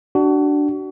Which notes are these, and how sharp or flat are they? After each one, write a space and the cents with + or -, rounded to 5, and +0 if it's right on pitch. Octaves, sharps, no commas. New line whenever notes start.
D4 +0 F#4 +30